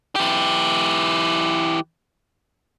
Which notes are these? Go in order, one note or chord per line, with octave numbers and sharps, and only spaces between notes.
E3 G4